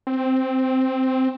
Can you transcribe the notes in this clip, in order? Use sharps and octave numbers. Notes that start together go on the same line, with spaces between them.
C4